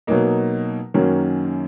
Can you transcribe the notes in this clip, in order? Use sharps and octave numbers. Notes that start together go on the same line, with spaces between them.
B2 F#3 A#3 D#4
F#2 D#3 F#3 A#3 C#4